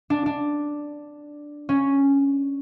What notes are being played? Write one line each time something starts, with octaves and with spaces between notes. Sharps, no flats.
D4
D4
C#4